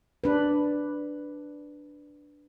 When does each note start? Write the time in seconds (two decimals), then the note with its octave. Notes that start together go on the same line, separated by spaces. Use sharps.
0.24 D4 B4